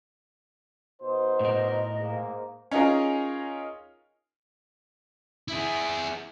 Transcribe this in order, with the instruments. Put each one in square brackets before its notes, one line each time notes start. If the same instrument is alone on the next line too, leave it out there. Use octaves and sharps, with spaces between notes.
[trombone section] B2 D#4 C5
[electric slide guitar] A2 A#4 [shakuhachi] D#5
[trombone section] G#2 A#3
[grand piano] C#4 D#4 F4 G#4 A#4
[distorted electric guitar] E4 G#4